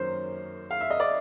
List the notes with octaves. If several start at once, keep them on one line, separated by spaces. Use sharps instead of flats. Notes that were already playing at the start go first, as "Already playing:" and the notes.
Already playing: F#2 D#3 F#3 A#3 C#4 C5
F5
E5
D#5
D5